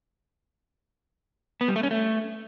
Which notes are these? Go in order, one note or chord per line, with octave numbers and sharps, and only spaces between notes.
B3
G3
A3
C#4
A3